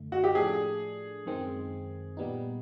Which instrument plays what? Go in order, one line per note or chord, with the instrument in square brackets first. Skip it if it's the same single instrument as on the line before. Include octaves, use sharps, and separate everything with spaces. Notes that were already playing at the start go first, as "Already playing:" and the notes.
Already playing: [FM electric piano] F#2 D3 A3
[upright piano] F#4
G4
[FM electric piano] A2 F3 A3 D4 [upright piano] G#4
[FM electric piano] F#2 D#3 G#3 C4
A#2 G3 B3 D#4